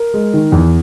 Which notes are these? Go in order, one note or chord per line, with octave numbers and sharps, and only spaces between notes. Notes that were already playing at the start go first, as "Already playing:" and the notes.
Already playing: A#4
G#3
D#3
E2